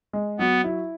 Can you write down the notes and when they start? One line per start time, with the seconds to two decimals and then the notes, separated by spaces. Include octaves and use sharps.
0.13 G#3
0.39 F#3 B3
0.64 E4